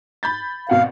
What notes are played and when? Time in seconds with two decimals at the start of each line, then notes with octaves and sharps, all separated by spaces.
0.23 B5 G6 A6
0.70 G#1 B2 F5 F#5